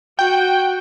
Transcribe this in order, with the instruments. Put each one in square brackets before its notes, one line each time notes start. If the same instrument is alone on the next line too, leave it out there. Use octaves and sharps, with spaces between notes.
[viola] F#4 [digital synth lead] G5